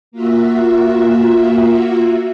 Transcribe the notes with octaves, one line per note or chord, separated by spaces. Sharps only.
A#3 F4 F#4 E5